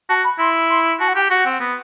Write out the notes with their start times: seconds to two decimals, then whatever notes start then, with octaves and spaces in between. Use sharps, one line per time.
0.09 F#4 A5
0.24 B5
0.39 E4 C6
0.70 C6
1.00 F#4 A5
1.08 F#5
1.15 G4 G5
1.30 F#4 F#5
1.46 C4
1.60 B3